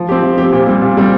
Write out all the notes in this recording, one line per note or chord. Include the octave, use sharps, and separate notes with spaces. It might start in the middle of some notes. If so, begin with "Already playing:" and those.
Already playing: F3
C4 G4
F3
G4
C4
A#2
G3 C4
A#2
G3 C4